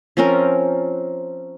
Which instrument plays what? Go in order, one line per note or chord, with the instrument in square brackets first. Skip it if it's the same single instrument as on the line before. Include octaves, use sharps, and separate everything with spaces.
[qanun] F3 C4 C#4 A#4